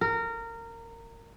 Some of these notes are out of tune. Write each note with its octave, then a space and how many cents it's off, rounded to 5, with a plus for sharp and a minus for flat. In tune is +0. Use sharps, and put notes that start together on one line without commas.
A#4 -20